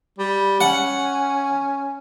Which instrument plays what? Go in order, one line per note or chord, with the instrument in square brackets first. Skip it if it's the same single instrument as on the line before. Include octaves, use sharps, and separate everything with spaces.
[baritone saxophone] G3
[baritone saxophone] C#4 [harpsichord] F#5